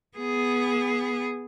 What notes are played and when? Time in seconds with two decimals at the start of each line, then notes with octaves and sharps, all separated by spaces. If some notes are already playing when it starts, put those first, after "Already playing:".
0.17 B3 G#4